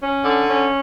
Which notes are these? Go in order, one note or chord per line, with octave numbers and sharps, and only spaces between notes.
C#4
D3
C#4